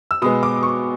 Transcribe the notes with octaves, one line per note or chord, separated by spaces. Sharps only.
E6
B2 G#3 B3 D#6
D6
C#6